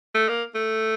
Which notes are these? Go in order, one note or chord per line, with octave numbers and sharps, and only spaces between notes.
A3
A#3
A3